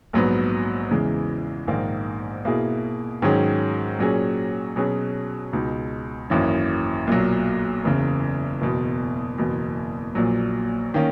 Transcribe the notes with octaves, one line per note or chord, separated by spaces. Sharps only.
A#1 G#2 F#3 B3
E2 C#3 E3 G#3
A#1 G#2 D#3 A#3
B2 A#3 E4 G#4
G#2 D#3 F#3 C#4 G#4
A#2 F#3 C#4 G#4
B2 F#3 C#4 G#4
C#2 B2 G#3 D#4
G#1 F#2 E3 A#3 C#4
B1 A#2 F#3
F#1 E2 C#3
F#1 E2 B2
F#1 E2 B2
A#1 A#2 F#3
D#3 A#3 C#4